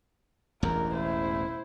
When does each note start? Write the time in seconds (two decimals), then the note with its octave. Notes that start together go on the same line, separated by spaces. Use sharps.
0.63 E1 A1 E2 A#4
0.94 E4 C5